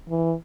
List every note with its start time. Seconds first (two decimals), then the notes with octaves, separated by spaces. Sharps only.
0.09 E3